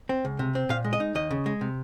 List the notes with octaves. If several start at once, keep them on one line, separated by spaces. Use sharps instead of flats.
C4
C#2
C3
C4
A#2 F5
G#3
D#5
D#4
D#2 D#5
C#3
G#3
C3